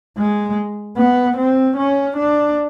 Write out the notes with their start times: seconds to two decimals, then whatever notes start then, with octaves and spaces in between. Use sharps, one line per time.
0.18 G#3
0.97 B3
1.37 C4
1.76 C#4
2.16 D4